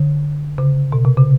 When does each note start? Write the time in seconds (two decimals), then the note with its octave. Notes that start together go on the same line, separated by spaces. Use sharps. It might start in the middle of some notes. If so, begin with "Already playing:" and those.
Already playing: D3
0.58 C#3
0.92 B2
1.05 C3
1.17 C#3